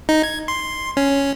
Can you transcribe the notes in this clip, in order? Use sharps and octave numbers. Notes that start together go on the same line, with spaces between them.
D#4
G#6
C6
C#4